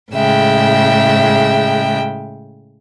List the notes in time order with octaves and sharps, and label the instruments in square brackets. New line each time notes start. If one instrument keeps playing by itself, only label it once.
[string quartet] A2 C#3 G#3 E5 G5